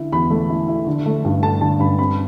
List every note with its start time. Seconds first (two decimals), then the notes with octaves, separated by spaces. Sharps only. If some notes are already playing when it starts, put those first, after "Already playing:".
Already playing: D3 E4
0.12 E2 B5
0.30 A3
0.49 E4
0.68 E4
0.87 D3
1.06 A3
1.25 G2
1.43 A3 A5
1.61 D3 A5
1.80 G2 B5
1.99 C4 B5